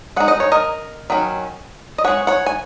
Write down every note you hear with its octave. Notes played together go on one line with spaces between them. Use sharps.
G#3 D#4 F#5
D#5
C#5
A#4 D#5
D#3 F#3 C#4
D#5
G#3 C#4 C#5 F#5
C#5 F#5
G#5